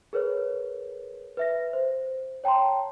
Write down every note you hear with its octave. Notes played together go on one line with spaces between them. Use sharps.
G#4 A#4 B4 C#5
B4 E5 A#6
C5
C#5 G5 A5 A#5 C6